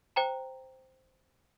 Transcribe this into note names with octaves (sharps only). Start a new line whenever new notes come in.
C5 G5 A#5